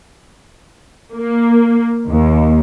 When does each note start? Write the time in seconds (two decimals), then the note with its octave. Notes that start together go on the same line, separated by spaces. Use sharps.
1.17 A#3
2.07 D#2